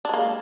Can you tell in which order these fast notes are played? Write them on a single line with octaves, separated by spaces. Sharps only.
D4 G#3 A#3